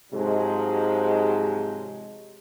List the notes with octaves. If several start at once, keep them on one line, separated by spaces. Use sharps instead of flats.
G#2 C3 F3 F#3 G#3